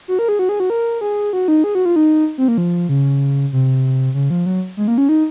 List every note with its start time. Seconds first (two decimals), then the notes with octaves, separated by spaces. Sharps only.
0.08 F#4
0.19 A#4
0.29 G#4
0.39 F#4
0.49 G#4
0.60 F#4
0.70 A#4
1.01 G#4
1.33 F#4
1.48 D#4
1.64 G#4
1.75 F#4
1.85 F4
1.96 D#4
2.38 C4
2.48 A#3
2.58 F3
2.89 C#3
3.53 C3
4.14 C#3
4.30 F3
4.46 F#3
4.77 G#3
4.88 A#3
4.98 C#4
5.09 D#4